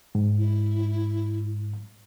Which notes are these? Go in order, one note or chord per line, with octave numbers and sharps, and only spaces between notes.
G#2
E4